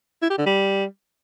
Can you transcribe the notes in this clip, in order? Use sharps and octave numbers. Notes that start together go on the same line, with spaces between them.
E4
G4
D3
G3